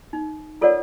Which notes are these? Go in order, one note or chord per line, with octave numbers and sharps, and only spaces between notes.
D#4
F4 A4 A#4 C#5 D5 F#5